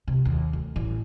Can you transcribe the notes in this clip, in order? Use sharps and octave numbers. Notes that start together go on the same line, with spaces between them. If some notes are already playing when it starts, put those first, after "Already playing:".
C3
D#2
D2
A1